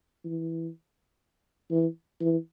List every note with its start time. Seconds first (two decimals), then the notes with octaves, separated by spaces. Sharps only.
0.25 E3
1.71 E3
2.21 E3